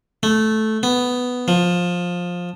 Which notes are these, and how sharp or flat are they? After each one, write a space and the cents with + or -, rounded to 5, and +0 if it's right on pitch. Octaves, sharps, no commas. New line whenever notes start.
A3 -10
B3 +5
F3 +15